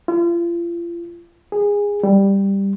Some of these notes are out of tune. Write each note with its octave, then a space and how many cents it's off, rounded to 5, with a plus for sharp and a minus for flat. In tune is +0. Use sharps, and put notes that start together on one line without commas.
F4 -40
G#4 -20
G3 +5